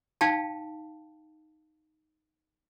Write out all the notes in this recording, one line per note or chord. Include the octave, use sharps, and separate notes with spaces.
D#4 F5 G5 A5